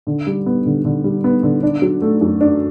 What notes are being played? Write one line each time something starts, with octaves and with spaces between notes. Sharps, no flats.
D3
G3
B3
D3
D3
G3
B3
D3
D4
F#3
A3
F#2
D4